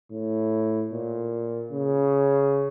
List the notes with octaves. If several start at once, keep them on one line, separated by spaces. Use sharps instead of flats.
A2
A#2
C#3